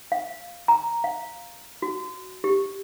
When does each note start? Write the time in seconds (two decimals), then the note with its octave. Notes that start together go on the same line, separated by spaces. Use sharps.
0.12 F5
0.68 A#5
1.04 F5
1.82 F#4
2.44 G4